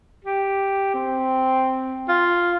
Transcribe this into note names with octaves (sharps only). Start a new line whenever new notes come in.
G4
C4
F4